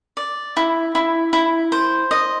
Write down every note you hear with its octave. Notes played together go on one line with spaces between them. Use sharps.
D5
E4
E4
E4
C5
D#5